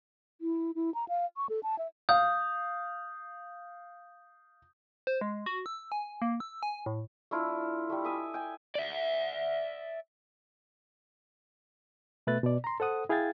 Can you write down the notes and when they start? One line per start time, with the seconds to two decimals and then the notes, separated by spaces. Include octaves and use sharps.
0.41 E4
0.75 E4
0.94 A#5
1.09 F5
1.37 C#6
1.49 A4
1.63 A5
1.79 E5
2.09 F5 D#6 G6
5.07 C5
5.21 G#3
5.46 F#4
5.66 E6
5.92 G#5
6.22 A#3
6.40 E6
6.63 G#5
6.86 A2
7.31 A3 D4 E4 F4
7.90 G3 A3
8.04 E5 G#5 D6 D#6
8.34 G5 G#5
8.75 D5 E5
12.27 B2 A3 B4 E5 F#6 A6
12.43 B2 D5
12.64 A#5 C6
12.80 A4 C5 F#5 D#6
13.09 E4 G#4 F5 G5 G#6 A6